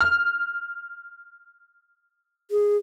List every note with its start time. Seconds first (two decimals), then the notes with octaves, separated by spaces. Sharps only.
0.01 F6
2.51 G#4